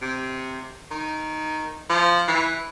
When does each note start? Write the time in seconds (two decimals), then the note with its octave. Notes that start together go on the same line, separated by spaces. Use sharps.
0.02 C3
0.91 D#3
1.90 F3
2.28 E3